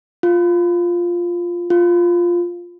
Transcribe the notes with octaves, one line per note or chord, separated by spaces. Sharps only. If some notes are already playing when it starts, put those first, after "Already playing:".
F4
F4